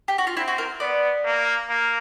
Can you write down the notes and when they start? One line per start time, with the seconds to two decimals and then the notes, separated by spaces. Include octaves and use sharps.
0.08 G4
0.18 F#4
0.27 F4
0.37 C4 E4
0.48 F#4
0.58 A#4
0.80 B3 D5
1.25 A#3
1.69 A#3